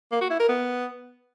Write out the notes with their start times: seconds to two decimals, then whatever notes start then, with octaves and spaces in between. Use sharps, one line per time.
0.12 A#3
0.21 F#4
0.30 E4
0.40 A#4
0.49 B3